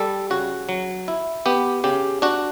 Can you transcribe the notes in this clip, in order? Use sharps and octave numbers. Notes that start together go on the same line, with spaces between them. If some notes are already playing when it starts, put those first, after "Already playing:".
Already playing: G3 A4
C#3 F#4
F#3
E4
B3 G4
C#3 G4
D4 F#4